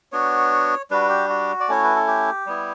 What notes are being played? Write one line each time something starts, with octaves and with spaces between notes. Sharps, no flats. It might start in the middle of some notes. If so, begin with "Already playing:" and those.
B3 D4 F#4 C#5
G3 D4 F#4 B4
G4
F#4
D5
A3 C#4 E4 C#5
B4
A4
G4
G3 B3 E4